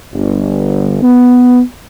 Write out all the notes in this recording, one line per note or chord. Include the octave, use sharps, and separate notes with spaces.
G1
B3